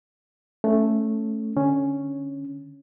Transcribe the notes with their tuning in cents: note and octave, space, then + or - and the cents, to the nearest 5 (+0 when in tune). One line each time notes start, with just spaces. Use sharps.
A3 +0 C#4 +0
D3 +10 C#4 +0